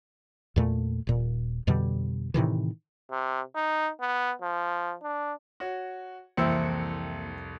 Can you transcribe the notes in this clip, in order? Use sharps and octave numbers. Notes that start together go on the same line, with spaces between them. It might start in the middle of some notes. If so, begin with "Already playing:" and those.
E2 A#2 A3
D#1 A#2
F2 B2 D3 G3
A2 C3 D#3 E3
C3
D#4
B3
F3
D4
F#4 C#5
C2 F2 E3 A#3 C4 E4 C#7